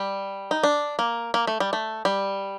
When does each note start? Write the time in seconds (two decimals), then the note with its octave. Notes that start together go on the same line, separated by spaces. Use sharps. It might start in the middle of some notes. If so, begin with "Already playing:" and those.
Already playing: G3
0.51 D#4
0.63 D4
0.99 A#3
1.34 A#3
1.47 A3
1.60 G3
1.73 A3
2.05 G3